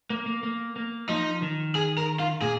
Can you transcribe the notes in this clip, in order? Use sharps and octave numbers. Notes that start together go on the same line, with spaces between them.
A#3
A#3
A#3
A#3
F3 D#4
D#3
G#4
A#4
F4
A#2 G#4